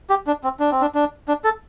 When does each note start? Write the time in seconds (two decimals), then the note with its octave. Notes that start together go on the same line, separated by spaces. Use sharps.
0.10 G4
0.27 D4
0.44 C4
0.60 D4
0.71 C4
0.81 D4
0.95 D4
1.28 D4
1.44 A4